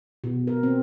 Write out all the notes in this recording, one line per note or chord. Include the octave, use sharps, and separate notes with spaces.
B2
A#4
C4